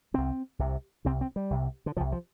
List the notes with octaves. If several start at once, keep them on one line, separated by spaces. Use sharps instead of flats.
C2 C3 C4
C2 C3
C2 C3 C4
C4
G3
C2 C3
D3
C2 C3 F3
F3